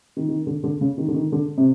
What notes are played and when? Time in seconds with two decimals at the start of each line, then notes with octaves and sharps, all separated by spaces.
0.17 D#3
0.28 D#3
0.47 D3
0.64 D3
0.81 C#3
0.98 D#3
1.08 D3
1.14 D#3
1.32 D3
1.58 C3